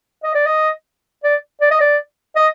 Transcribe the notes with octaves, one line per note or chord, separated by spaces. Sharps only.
D#5
D5
D#5
D5
D5
D#5
D5
D#5